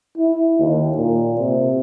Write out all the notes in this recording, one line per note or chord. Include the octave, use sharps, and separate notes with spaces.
E4
D#2
A#2
C3